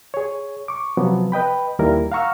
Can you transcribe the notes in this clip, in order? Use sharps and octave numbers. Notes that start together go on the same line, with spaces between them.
G#4 C#5
C#6 D6
C3 F3 F#3 B3
B4 D#5 G5 B5
D#2 D#3 G3 A#3 E4 A#4
F5 F#5 A#5 C#6 E6 F6